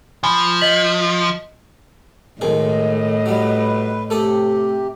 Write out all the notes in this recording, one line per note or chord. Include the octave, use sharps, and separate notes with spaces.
F3 G#5 B5
D#5 B6 F#7
B1 A2 D#3 G#3 G#4 D#5
F#3 G3 B4
C3 A3 G4 A4 D#6